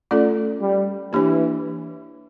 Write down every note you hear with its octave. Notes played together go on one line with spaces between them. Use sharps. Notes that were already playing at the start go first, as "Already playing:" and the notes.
A3 C#4 F4 A4 D5
G3
E3 A#3 D4 G4 C#5